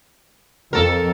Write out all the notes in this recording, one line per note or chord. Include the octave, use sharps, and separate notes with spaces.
F2 A4 A#4